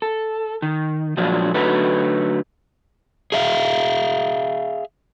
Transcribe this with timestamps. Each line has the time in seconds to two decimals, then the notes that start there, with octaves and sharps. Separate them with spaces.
0.02 A4
0.62 D#3
1.17 A#2 F3 F#3 G#3 D4 F4
1.54 D3 F#3 A3 D#4 F#4 B4
3.32 G#4 E5 F5